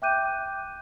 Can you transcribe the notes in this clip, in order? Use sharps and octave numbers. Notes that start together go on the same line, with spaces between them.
E5 G5 D6 F#6 G6 D#7